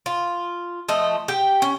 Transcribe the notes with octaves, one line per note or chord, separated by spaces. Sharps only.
F4
F3 A3 D#5
G4 G5
C#4